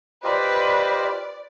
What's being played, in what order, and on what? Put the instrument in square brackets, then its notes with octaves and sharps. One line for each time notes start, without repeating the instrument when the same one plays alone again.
[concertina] F4 G4 [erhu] B4 [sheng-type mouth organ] C5 D#5 [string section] D5